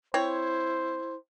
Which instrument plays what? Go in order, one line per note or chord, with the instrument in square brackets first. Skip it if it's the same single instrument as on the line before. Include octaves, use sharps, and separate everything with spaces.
[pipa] C4 C#5 [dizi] E4 [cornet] C5